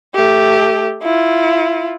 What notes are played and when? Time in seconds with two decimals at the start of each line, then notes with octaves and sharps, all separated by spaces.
0.15 A3 G4
1.03 E4 F4